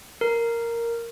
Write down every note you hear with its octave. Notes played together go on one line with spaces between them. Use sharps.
A#4